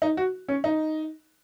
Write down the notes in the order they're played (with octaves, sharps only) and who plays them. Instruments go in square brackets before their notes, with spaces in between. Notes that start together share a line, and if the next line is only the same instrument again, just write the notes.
[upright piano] D#4
F#4
C#4
D#4